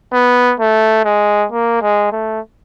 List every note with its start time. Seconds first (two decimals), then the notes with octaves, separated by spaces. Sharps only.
0.13 B3
0.60 A3
1.05 G#3
1.52 A#3
1.82 G#3
2.12 A3